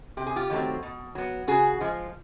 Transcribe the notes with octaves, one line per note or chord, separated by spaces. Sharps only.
C3 G4
G#4
F4 G4
D#3 F#3 A3 C4
B2
F#3 B3
C#3 F#4 G#4
F3 G#3